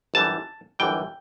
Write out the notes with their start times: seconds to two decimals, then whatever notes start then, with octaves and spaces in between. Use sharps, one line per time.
0.14 G1 F#2 E3 G3 A5
0.79 G1 F#2 E3 G3 G5